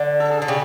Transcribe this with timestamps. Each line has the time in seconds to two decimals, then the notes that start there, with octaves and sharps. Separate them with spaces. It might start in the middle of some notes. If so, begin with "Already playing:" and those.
Already playing: D3
0.20 A4
0.31 G#4
0.42 D3
0.48 C#3 G4